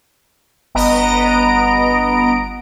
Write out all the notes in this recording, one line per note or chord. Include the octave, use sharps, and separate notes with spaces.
G1 B3 D#5 A#5 D7